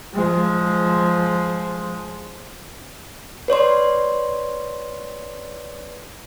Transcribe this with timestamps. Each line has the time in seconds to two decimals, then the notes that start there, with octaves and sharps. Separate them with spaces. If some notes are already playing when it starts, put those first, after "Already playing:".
0.14 F3 G#3
3.48 B4 C#5 D5 C6